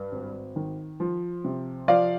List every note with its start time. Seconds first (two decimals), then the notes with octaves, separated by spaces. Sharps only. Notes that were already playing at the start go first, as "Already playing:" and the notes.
Already playing: G2
0.12 G#1
0.56 D#3
1.00 F3
1.44 C3
1.88 F3 D5 F5